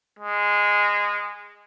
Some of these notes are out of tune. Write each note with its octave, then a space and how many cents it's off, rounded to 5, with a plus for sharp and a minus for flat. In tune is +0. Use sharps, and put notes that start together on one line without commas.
G#3 -15